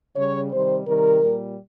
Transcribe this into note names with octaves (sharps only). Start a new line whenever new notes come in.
C#3 G3 C#5
C3 D#3 G3 C5
C3 D#3 G3 A#4
A#2 G3